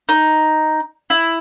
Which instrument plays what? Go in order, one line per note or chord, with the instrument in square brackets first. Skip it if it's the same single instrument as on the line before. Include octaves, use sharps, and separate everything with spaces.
[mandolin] D#4
E4